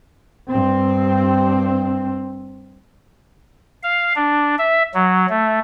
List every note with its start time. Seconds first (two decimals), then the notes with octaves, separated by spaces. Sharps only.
0.50 G2 C4
3.83 F5
4.16 D4
4.58 E5
4.94 F#3
5.29 A3